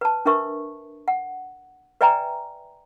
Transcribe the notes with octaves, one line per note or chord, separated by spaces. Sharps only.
B4 A5
D4 A#4 B4 E5 C#6
F#5
B4 D5 E5 G5 G#5 A#5